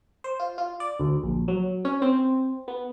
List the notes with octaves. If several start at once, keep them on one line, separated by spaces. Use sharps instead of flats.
C5
F4
F4
D5
D2
A#1
F#3
C#4
C4
B3